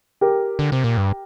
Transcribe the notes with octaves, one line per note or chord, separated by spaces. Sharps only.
G4 A#4
D3
C3
A#2
G2